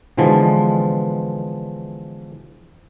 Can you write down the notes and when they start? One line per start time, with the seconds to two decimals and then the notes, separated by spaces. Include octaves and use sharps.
0.17 B2 D3 E3 F3 G#3